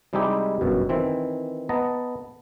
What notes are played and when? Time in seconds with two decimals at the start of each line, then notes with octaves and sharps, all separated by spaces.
0.13 C3 G3 G#3 D#4 E4 G4
0.61 G1 F#2 B2
0.89 D#3 E3 C4
1.69 B3 D#5 A5 A#5